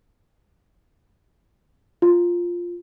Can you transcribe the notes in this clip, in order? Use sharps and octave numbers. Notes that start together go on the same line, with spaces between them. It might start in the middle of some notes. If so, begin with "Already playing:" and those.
F4